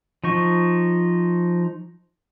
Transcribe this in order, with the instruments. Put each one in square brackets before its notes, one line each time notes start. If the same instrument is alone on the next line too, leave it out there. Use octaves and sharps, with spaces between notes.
[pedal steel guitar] F3 D#4 C#6